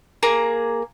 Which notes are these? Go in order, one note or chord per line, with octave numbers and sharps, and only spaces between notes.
A#3 G#4 A#5